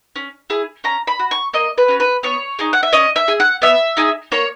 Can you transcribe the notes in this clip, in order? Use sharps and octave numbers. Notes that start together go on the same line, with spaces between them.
C#4
E4 G#4
C#4 A#5
B5
F#4
C#6
A#3 D#5
B4
C#4 F#4
B4
B3 C#5
D#4 G#4
F#5
E5
C#4 D#5
E5
G#4
F#5
B3 E5
D#4 G#4
A#3 C#5